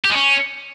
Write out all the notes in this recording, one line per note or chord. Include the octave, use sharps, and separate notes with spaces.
G4
G#3
C#4